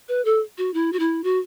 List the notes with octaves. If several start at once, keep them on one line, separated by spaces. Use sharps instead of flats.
B4
A4
F#4
E4
F#4
E4
F#4